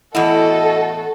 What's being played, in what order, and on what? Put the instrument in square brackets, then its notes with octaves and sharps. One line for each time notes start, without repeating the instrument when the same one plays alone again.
[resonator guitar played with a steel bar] E2 A2 E4 [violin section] F#4 A4 [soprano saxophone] D#5 [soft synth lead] F#5